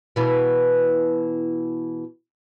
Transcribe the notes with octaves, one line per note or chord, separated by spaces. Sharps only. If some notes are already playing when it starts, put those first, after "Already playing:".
B2 E3